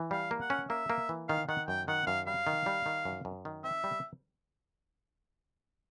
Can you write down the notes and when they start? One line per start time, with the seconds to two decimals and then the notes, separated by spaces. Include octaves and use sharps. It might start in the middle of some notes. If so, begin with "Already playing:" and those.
Already playing: E3
0.11 G3 F5
0.31 A#3
0.41 F#5
0.50 C#4
0.70 A#3 E5
0.90 A#3
1.09 E3
1.28 D#3 F5
1.49 D#3 F#5
1.68 F#2 G5
1.88 D#3 F#5
2.07 F#2 F5
2.27 G3 F5
2.47 D#3
2.66 G3
2.86 D#3
3.05 F#2
3.25 F#2
3.45 D#3
3.64 C4 E5
3.84 G3